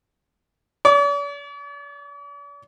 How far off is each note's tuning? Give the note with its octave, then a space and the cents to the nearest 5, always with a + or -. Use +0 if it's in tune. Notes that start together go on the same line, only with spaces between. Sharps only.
D5 -45 D6 +0